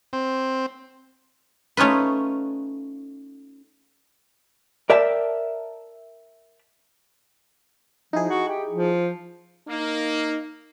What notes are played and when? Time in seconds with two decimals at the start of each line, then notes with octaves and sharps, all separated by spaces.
0.13 C4
1.77 A3 C#4 D#4 F4 B4
4.90 A#4 D5 E5 G5 A5
8.13 F3 D#4 E4 G#4
8.29 F#4
8.48 G4
8.69 F3
9.68 A#3 D#4